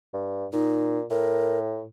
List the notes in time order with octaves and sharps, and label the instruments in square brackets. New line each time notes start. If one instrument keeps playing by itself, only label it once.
[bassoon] G2
[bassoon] A#2 [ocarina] D#4
[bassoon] A2 [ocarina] A#4